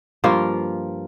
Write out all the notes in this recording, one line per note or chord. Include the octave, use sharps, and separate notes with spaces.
G2 F3 A#3 F4